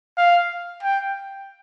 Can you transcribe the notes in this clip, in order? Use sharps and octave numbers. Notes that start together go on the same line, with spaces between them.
F5
G5